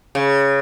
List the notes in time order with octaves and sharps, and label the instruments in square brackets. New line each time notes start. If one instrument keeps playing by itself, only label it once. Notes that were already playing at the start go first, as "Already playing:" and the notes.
[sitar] C#3